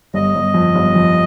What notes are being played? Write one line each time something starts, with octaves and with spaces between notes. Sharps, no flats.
G1 D#5
G1
F2
G1
F2